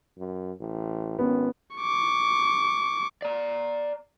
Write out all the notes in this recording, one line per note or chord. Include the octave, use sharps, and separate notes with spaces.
F#2
A1
G#1 B3 C#4
C#6 D6
D5 A#5